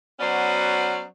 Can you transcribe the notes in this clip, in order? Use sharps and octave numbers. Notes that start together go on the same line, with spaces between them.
F#3 B3 C#4 F#4 C5 D5